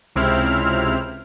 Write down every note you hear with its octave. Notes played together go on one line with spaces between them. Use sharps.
C#2 C3 C4 E4 F6